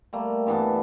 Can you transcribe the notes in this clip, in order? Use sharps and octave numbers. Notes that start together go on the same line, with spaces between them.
G3 A3 A#3
G2 E3 B3 A5